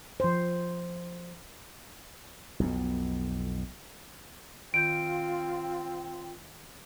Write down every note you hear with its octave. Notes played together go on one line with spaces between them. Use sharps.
F3 C5
B1 F2 B2
D#3 C4 F4 G6 D7